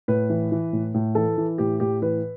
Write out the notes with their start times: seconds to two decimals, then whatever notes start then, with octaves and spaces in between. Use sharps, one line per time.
0.08 A2 B4
0.30 E3
0.52 E3
0.73 A2
0.94 A2
1.15 E3 A4
1.37 E3
1.58 A2 G4
1.80 A2 G4
2.02 E3 B4